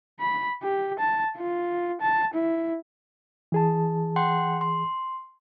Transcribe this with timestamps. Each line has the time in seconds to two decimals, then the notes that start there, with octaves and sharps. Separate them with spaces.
0.20 B5
0.63 G4
0.99 A5
1.37 F4
2.01 A5
2.34 E4
3.52 E3 G#4 A5
4.16 F#5 G5 C6
4.61 C6